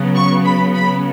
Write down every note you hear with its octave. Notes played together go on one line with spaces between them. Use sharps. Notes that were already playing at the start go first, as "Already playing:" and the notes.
Already playing: C#3 F#3 B3
C#6
B5
B5